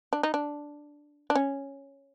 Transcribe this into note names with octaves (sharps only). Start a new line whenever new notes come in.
D4
D#4
D4
D4
C#4